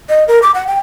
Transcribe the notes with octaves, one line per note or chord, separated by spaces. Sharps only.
D#5
A#4
D6
F#5
G5